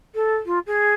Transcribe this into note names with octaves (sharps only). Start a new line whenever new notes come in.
A4
F4
G#4